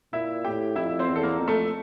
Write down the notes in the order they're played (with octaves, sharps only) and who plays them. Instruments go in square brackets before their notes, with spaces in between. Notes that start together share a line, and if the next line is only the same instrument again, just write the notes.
[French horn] A#2 [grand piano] E4 E5
[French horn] A2 [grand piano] G4 G5
[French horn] F2 [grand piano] E4 E5
[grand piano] C4 C5
[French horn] E2
[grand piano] A4
A#3 A#4
[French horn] F2
[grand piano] A3 A4